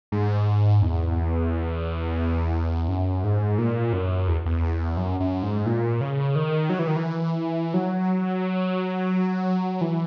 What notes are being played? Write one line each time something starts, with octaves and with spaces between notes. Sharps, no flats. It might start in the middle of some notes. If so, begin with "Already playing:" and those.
G#2
E2
F#2
G#2
A#2
F#2
E2
E2
F#2
F#2
G#2
A#2
C#3
D#3
F#3
E3
D#3
E3
F#3
E3